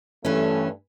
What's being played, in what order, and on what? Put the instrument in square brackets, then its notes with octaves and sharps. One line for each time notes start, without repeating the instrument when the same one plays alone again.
[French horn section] G2 A3 [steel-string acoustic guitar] E3 C#4